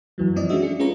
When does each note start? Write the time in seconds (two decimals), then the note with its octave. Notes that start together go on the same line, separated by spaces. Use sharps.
0.18 F#2 E3 F#3
0.36 F3 C4 D5 D#5
0.49 G#3 C#4 D4 F#4 E5
0.62 G#4 C#7
0.79 C#4 F4 G#4 B4 C#5 A#5